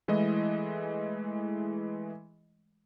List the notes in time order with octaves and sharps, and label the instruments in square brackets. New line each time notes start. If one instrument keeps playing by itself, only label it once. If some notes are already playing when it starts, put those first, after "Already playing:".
[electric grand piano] E3 G#3 A3 E4 D#5